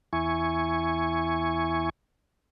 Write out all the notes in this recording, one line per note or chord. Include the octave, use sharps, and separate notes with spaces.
E2 E4 G#5 C#6